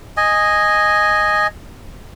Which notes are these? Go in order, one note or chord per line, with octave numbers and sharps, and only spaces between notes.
D#5 G#5